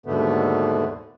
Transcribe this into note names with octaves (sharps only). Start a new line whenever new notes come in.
D#2 G#2 B2 D3 A3 B3